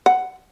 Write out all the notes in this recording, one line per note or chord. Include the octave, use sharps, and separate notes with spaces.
F#5